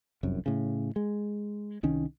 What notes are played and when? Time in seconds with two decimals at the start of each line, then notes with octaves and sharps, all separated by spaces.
0.23 F1 C2 F#2
0.46 A2 C#3
0.96 G#3
1.83 C2 D#3 C#4